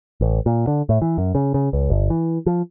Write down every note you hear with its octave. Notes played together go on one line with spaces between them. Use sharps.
A1
A#2
D3
A2
E3
F#2
C#3
C#3
C#2
G1
E3
F3